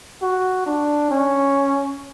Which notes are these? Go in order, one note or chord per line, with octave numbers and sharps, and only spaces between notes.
F#4
D4
C#4